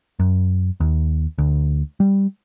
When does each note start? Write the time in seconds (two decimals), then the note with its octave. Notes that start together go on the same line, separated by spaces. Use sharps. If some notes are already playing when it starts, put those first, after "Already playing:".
0.19 F#2
0.80 D#2
1.38 D2
2.00 G3